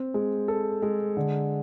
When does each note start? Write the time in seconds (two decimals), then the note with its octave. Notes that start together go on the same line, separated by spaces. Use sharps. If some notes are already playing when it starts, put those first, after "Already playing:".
Already playing: C4
0.14 G#3
0.48 A4
0.82 G#3
1.17 D3